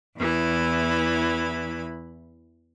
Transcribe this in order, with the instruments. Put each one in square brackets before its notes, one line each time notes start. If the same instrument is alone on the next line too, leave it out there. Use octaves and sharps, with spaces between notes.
[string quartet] E2 E3 B5